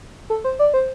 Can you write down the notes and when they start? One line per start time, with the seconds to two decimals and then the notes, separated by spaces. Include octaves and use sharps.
0.30 A4
0.44 C5
0.59 D5
0.74 C5